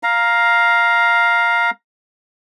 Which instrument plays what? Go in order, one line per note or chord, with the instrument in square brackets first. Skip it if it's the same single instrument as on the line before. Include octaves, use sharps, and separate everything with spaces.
[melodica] F5 A#5